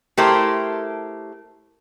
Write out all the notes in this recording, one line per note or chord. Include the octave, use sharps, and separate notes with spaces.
A3 E4 G4 A#4 C5